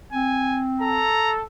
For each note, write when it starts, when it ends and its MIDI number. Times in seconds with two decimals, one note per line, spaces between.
0.13 1.06 60
0.13 0.62 80
0.81 1.42 69
0.81 1.33 82